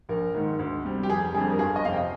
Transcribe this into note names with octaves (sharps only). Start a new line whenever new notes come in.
A#1 A#4
G#2 D#3
D2
C3 G3
G4
F1 G#4
F2 D3 G3 G#4
A#4
G1 G#4
D#5
F2 C3 F5
G5